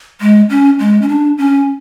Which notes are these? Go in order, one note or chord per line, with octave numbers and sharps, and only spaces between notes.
G#3
C#4
G#3
C#4
D4
C#4